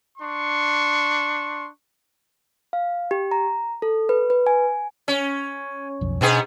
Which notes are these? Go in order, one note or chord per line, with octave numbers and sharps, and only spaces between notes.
D4 C6 C#6
F5
G4
A#5
A4
B4
B4
G#5
C#4
B1 F2
G#2 B2 B3 D4 G#4